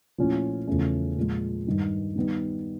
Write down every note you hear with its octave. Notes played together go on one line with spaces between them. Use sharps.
A#2 F3 A3 C#4 E4
E2 C#3 F3 A3 C#4
A#2 F3 G#3
G2 D#3 G3
D#3 G3 B3 D#4